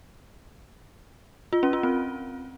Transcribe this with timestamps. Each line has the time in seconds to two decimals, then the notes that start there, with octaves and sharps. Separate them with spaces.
1.53 F4
1.63 C#4
1.73 F4
1.83 C4